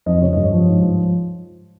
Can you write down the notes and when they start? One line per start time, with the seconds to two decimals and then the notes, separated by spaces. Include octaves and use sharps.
0.06 F2 D#5
0.21 C#3 C#5
0.33 G2 D#5
0.44 C#5
0.52 F3
0.67 G#2
0.82 F3